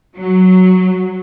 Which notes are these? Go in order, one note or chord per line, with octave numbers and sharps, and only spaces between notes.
F#3